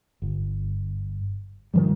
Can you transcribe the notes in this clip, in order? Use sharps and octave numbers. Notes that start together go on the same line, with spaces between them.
G1
A#2 D#3 F3 G3